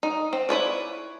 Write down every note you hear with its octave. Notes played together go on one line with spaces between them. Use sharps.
D#4
C4
E4 B4 C#5 D5